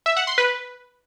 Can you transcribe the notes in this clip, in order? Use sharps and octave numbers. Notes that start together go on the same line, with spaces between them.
E5
F#5
C6
B4